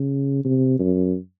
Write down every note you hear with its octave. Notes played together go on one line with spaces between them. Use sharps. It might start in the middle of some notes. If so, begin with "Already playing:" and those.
Already playing: C#3
C3
F#2